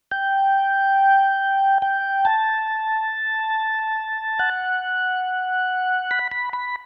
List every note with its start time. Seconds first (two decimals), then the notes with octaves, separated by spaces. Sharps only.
0.11 G5
1.82 G5
2.25 A5
4.40 F#5
6.11 B5
6.32 B5
6.53 B5